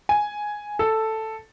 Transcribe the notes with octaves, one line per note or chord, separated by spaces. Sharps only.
G#5
A4